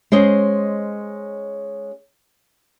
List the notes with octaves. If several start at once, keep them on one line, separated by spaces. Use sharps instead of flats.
G#3 C#4 C5 D#5